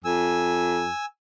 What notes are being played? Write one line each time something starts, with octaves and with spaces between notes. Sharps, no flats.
F2 G#5 E6